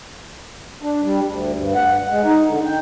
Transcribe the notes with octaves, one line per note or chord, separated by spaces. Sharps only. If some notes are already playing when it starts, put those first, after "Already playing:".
D4
G3
D2
G2
F#5
G#3
D#4
D3
G5